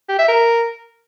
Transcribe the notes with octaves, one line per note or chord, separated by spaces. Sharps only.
G4
E5
A#4